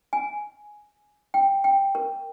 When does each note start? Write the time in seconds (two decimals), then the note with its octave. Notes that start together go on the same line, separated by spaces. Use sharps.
0.13 G#5
1.34 G5
1.64 G5
1.95 A#4